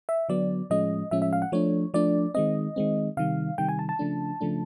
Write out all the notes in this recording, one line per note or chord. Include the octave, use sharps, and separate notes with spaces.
E5
D3 F#3 B3 D5
A2 F3 G#3 C#4 D#5
A2 F3 G#3 C#4 E5
E5
F5
F#5
F3 A3 D4 C#5
F3 A3 D4 D5
D#3 G#3 C4 D#5
D#3 G#3 C4
C3 D#3 G3 F5
C3 D#3 G3 G5
G#5
A5
A5
C#3 F3 A3 D4
C#3 F3 A3 D4